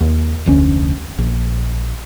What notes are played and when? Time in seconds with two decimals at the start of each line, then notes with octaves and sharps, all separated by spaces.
0.01 D#2
0.46 F1 D2 C#4
1.18 A#1